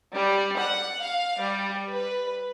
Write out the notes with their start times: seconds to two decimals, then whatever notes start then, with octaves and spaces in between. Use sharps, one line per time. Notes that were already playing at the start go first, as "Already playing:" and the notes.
0.11 G3
0.58 F#5
1.01 F5
1.40 G3
1.91 B4